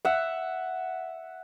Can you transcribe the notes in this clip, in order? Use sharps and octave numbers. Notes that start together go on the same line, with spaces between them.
E5 F#5